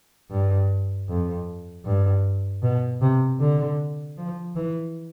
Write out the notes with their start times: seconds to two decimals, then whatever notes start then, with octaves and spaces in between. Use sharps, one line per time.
0.31 G2
1.08 F2
1.85 G2
2.63 B2
3.01 C3
3.40 D3
4.18 F3
4.56 E3